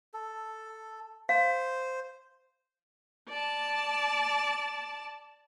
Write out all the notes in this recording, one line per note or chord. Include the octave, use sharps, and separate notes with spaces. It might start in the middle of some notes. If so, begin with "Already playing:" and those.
A4
C5 F5
D5 A5